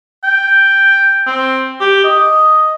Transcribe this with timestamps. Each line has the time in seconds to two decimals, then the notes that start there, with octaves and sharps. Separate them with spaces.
0.24 G5
1.27 C4
1.80 G4
2.04 D#5